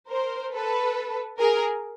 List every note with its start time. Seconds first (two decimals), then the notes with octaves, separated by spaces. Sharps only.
0.09 A#4 C5
0.53 A4 B4
1.39 G#4 A#4